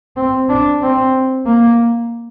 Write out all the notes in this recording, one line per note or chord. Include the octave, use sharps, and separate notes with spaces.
C4
D4
C4
A#3